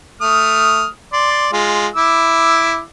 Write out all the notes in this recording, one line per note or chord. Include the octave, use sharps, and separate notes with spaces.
A3 D#6 F6
D5 C6
G#3 F4
E4 D6 E6